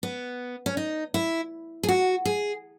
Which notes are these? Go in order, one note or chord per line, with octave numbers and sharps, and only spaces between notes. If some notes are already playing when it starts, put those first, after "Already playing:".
B3
C#4
D#4
E4
G#4
F#4
G#4